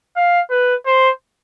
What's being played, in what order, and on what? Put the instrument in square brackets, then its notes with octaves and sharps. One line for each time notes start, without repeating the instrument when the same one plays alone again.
[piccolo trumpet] F5
B4
C5